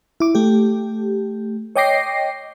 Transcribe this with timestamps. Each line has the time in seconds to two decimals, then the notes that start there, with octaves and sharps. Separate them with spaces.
0.20 E4 D6
0.35 A3 G4
1.76 C#5 D#5 G5 D6 A#6 C7